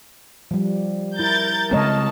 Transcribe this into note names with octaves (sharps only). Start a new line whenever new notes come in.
F3 G3
E4 A#4 G6 A6
C#3 G#3 C4 A#4 C#5 D#5 A5